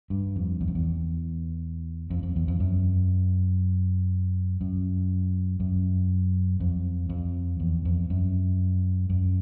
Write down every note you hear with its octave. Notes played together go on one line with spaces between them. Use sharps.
G2
F2
E2
F2
E2
F2
F2
E2
F2
F#2
F#2
F#2
F2
F2
E2
F2
F#2
F#2